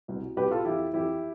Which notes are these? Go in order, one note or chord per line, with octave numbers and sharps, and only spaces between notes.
C2 B2
C2 B2 G4 B4
F4 A4
F2 E3 E4 G4
F2 E3 E4 G4